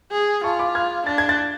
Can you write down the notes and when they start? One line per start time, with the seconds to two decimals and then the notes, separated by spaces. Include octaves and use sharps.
0.12 G#4
0.44 F4 A5 C#6
0.59 B5 D6
0.75 F6 G#6
1.06 D4 A6
1.18 G#6
1.29 F#6 A6